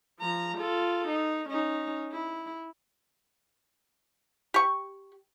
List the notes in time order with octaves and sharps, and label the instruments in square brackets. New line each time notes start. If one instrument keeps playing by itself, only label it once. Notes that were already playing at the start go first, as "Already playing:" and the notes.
[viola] F3 A#5
F4 A4
D#4
C#4 D#4
E4
[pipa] G4 C#6